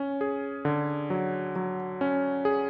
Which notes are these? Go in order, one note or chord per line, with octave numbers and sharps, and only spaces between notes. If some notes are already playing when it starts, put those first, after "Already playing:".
Already playing: C#4
G#4
D3
F#3
F#3
C#4
G#4